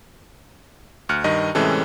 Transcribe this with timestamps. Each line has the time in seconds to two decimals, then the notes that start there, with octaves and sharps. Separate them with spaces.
1.09 D2 F6 F#6 C#7
1.24 G2 D#3 D#5
1.55 A2 C3 E3 G#3 C#4 A4